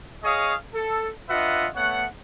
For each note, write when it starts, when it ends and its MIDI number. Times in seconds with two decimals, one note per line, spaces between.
0.23 0.54 68
0.23 0.54 73
0.23 0.54 75
0.23 0.54 77
0.23 0.54 85
0.23 0.54 87
0.74 1.10 69
1.29 1.68 62
1.29 1.68 65
1.29 1.68 71
1.29 1.68 75
1.29 1.68 76
1.29 1.68 78
1.76 2.05 57
1.76 2.05 59
1.76 2.05 73
1.76 2.05 78